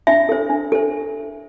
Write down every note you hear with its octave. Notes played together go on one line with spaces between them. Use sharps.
D4 E5
A4 C5
D4
A4 C5